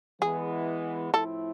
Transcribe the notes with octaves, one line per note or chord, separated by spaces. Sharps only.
E3 G#3 B3 G#4
A2 F3 A3 C4 E4 A4